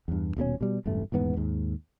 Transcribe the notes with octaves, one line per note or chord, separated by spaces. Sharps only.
E2 G2
D#1 B2 G#3 C#4
B2 G3
E1 A1 G2 A3
D#1 E2 G#2 B3
D#2 G#2